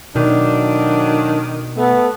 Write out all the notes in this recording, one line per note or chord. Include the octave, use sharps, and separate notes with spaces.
B2 D#3 F#3 A3 D4
A3 B3